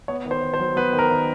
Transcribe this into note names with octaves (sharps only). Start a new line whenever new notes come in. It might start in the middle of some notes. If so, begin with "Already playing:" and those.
B3 C#5
D#3
C5
D#3
C5
F#3
B3 B4
D#3
A#4
D#3